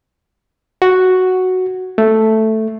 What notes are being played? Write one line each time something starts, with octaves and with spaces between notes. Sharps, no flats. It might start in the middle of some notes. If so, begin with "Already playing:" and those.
F#4
A3